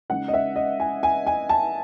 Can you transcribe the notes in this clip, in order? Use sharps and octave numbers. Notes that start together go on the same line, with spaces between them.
C#3 G#3 D#4 F#5
D#5
E5
D#5
G#5
G#5
G#5
A5